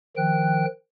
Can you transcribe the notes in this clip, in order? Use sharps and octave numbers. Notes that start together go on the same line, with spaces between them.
D#3 F3 G5 F#6